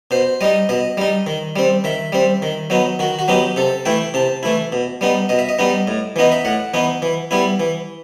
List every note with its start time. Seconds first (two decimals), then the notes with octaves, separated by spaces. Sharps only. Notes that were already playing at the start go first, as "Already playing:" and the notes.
0.11 B2 C5
0.41 G3 D#4 D#5
0.69 B2 D#5
0.97 G3 D#4
1.27 D#3
1.56 G3 C4
1.84 D#3 E5
2.12 G3 C4
2.42 D#3
2.70 F#3 B3 D#4
2.99 D#3 F#4
3.19 F#4
3.28 F#3 B3 D#4 G4
3.56 C3 A4
3.85 E3 A3 E4 G5
4.14 C3 A5
4.43 E3 A3 E4
4.72 B2
5.01 G3 B3 D#4
5.29 B2 D#5
5.39 E5
5.49 D#5
5.59 G3 B3 D#4
5.87 A2
6.16 E3 B3 D#4 D#5
6.32 E5
6.45 A2 F#5
6.74 E3 B3 D#4
7.02 E3
7.31 G3 B3 E4
7.60 E3